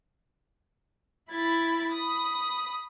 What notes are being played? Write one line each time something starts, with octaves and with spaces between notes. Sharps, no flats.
E4 B5 G#6 A6
B5 D#6